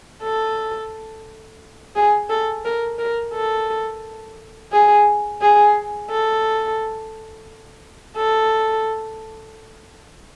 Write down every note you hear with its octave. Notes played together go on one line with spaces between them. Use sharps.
A4
G#4
A4
A#4
A#4
A4
G#4
G#4
A4
A4